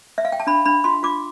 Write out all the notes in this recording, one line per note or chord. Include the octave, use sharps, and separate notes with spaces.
E5
F5
G5
A5
D4 B5
D4 B5
F4 C6
F4 D6